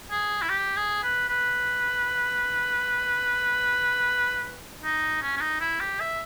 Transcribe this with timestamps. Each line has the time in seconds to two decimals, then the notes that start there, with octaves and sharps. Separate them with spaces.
0.11 G#4
0.42 E4
0.50 G4
0.77 G#4
1.03 B4
1.29 B4
4.82 D#4
5.22 C#4
5.37 C#4
5.41 D#4
5.61 E4
5.81 G4
6.00 E5